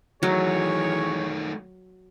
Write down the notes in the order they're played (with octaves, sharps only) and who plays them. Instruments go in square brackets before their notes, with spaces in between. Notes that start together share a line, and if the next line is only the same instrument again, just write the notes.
[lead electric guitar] D#3 A3 [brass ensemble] E3 G#4 C#5 [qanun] F#3